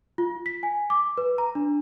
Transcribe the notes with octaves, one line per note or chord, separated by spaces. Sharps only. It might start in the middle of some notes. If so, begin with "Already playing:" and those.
F4
B6
G#5
D6
B4
A#5
D4